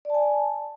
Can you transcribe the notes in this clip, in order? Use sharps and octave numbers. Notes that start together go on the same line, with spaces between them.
D5 G#5 A5